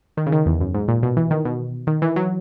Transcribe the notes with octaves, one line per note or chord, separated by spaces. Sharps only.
D#3
C#3
D#3
E2
F#2
G#2
A#2
B2
E3
D#3
B2
D#3
E3
F#3